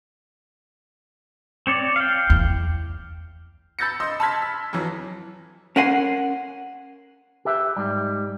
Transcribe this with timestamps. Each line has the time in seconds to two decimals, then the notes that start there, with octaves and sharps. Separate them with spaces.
1.67 C4 C#5 D5
1.96 F5 G5
2.30 E2
3.79 B5 E6 G6 A6 A#6 C#7
4.00 D#5 C6 E6
4.20 A5 B5 C6 F6 G#6 B6
4.42 E6
4.73 F2 E3 F#3
5.76 C#4 A#4 F#5 G#5 C6
7.45 G4 B4 E5
7.77 G#2 G3